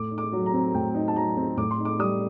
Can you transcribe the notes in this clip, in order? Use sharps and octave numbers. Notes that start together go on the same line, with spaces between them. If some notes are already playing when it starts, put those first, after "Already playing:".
Already playing: A2 D6
D#4
D6
F#3
A#5
C4
A2 G5
D#4
A5
F#3 A#5
C4
A2 D6
C6
D#4
D6
G3 D#6